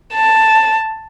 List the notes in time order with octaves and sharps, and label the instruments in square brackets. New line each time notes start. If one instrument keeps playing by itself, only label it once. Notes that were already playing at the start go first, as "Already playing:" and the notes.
[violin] A5